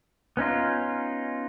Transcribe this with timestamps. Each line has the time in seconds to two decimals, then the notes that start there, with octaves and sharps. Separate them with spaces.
0.37 B3 C#4 D#4 F4